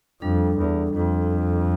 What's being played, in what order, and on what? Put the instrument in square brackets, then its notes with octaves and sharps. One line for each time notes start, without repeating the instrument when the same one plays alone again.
[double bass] F2 [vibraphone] G3 D4 A4
[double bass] E2
F2